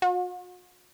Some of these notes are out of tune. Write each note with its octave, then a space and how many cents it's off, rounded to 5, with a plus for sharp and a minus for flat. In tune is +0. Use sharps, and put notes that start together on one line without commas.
F#4 -45